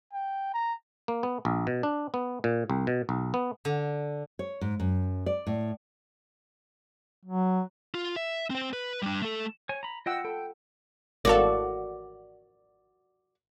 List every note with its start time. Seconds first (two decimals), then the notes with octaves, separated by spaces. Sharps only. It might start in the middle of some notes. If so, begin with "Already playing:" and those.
0.13 G5
0.53 A#5
1.08 A#3
1.23 B3
1.45 A#1
1.67 B2
1.83 D4
2.14 B3
2.44 A#2
2.70 C2
2.87 B2
3.09 B1
3.34 B3
3.65 D3
4.39 C#5
4.61 G#2
4.80 F#2
5.26 D5
5.47 A2
7.25 F#3
7.95 F4
8.16 E5
8.50 C4 C5
8.73 B4
9.03 G3 D4
9.22 A3 A4
9.69 C#5 G#5
9.83 A#5 B5
10.06 F4 D#5 F#5 G5 E6
10.25 A4 G5 B5
11.25 G#1 E3 F#4 A4 A#4 D5 F5